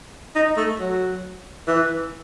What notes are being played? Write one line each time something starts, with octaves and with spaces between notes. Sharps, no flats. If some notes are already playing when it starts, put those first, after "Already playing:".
D#4
A3
F#3
E3